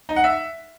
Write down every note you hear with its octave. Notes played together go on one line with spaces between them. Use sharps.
D#4
F#5
E5